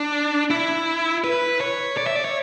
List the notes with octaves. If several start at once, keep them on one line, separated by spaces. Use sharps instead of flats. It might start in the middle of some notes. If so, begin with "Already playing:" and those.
Already playing: D4
E4
B4
C#5
D5
E5
D5
C#5